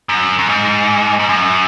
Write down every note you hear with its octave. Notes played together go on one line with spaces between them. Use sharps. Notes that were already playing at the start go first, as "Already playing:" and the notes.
F#2
F#2
G#2
G#2
F#2